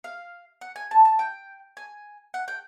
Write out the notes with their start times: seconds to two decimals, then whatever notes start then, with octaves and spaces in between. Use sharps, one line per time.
0.04 F5
0.61 F#5
0.76 G#5
0.91 A5
1.05 A5
1.19 G5
1.77 G#5
2.34 F#5
2.48 G5